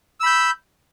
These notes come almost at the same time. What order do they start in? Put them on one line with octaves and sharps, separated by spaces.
E6 B5 G6